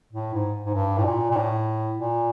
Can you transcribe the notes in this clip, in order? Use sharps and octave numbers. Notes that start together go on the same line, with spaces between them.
A2
G#2
G#2
G2
A2
A#2
A#2
A2
A#2